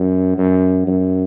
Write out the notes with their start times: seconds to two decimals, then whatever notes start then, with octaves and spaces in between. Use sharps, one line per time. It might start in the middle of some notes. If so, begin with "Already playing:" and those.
Already playing: F#2
0.38 F#2
0.87 F#2